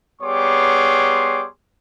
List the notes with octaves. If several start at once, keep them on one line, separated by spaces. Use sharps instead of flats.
G3 B3 G#4 C#5 C6 D6